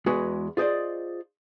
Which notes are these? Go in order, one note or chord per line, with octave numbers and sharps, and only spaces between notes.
E2 G#3 F#4 G#4 B4
F4 G#4 C5 D5 D#5